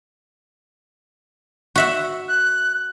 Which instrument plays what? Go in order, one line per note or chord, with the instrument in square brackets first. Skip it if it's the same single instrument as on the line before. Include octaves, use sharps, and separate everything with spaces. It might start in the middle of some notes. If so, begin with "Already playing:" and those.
[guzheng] F#4 E5 F#5
[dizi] F#6